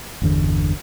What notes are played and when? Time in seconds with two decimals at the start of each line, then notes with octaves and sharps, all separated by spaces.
0.22 G1 E2 D3